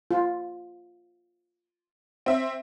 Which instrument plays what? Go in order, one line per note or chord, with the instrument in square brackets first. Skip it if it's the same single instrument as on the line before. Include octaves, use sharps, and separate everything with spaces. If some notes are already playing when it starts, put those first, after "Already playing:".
[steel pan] F4
[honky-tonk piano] C4 E5